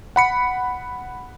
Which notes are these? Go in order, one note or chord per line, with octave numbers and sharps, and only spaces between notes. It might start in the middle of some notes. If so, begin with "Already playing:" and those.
F#5 B5 C#7